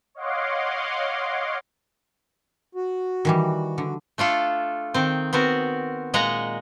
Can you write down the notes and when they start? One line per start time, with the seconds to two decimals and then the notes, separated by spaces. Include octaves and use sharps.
0.15 C#5 D#5 F5 F#5 C6 D6
2.75 F#4
3.25 D#3 E3 G3
3.78 D3
4.18 A3 D4 F4 A4
4.94 D#3 C4
5.33 B3 C4 F#4 A#4
6.14 A#2 G#3 D#5 F#5 A#5